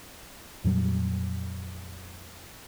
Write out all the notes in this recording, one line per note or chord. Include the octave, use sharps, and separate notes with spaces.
F2 A#2 F#3 G3